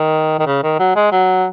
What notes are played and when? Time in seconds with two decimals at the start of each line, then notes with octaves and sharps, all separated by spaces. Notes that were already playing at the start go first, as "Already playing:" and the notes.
Already playing: D#3
0.39 D#3
0.46 C#3
0.63 D#3
0.79 F#3
0.96 G#3
1.12 F#3